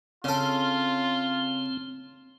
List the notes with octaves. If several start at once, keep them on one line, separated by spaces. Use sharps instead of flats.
C#3 C4 F4 A4